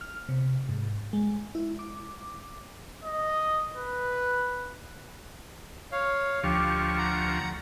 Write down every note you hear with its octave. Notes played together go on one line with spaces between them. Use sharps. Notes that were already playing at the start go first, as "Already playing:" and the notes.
F6
C3
G#2
G#3
E4
D6
D#5
B4
C#5 F5
D2 F3 G4 C#6
F#5 A#5